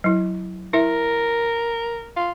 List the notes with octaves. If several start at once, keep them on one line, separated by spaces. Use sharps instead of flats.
F#3 E4
E4 A#4 E5
F4